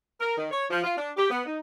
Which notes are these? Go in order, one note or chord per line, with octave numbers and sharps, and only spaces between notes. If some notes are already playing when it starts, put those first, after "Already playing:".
A#4
D#3
C#5
F3
F4
D4
G4
B3
D#4